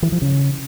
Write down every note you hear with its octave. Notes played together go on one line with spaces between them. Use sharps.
E3
F3
C#3